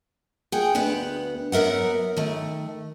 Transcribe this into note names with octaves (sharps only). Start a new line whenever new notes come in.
G#4 F#5 G5
D2 B3 B4 F#5
F#3 B3 A#4 E5 F#5
D#3 A3